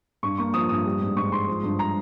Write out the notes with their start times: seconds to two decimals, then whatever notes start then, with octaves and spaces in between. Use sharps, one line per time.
0.23 G2 C#6
0.38 A#3 C#6
0.54 F3 D#6
0.69 G2 D#6
0.85 G3
1.01 G#2
1.16 G#2 C#6
1.32 G#2 C6
1.48 F3
1.63 G2
1.79 A#5